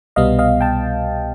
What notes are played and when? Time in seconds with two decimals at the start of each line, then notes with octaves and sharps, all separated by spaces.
0.16 C2 B2 G3 B3 D#5 F5
0.39 D#5 F5
0.61 G5 A5